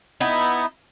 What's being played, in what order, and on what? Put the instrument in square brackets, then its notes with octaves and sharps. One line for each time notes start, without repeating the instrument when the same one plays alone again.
[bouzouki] B3 D#4 E4